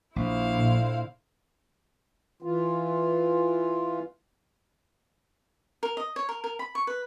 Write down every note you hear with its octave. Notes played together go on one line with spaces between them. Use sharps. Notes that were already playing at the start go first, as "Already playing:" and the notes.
A#1 E4 C5 F5
A#2 D3
E3 F4
A#4
D#5
C#5
A#4
A#4
B5
C#6
B4